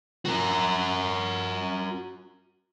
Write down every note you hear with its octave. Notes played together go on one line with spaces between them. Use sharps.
F#4 A#4